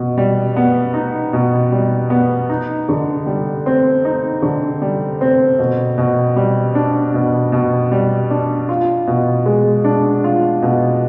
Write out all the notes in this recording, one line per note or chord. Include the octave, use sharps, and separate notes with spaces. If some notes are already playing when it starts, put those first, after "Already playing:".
Already playing: B2
G3
B3
D#4
B2
G3
B3
D#4
D3
G3
C4
D#4
D3
G3
C4
B2
B2
G3
D4
B2
B2
G3
D4
F4
B2
G#3
D4
F4
B2